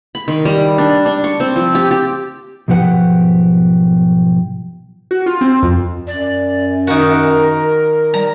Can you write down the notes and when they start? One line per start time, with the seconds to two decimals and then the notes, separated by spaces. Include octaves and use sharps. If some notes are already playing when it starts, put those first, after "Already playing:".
0.15 B5
0.28 D#3
0.45 G3
0.78 D4
1.06 D4
1.24 C#6
1.40 C4
1.56 F3
1.75 G4
1.91 G4
2.68 B1 G#2 F3 G4 B4 F#5
5.11 F#4
5.26 F4
5.41 C4
5.63 F2
6.07 F#2 D5
6.87 D#3 F#4 A#4
8.14 G3 A#5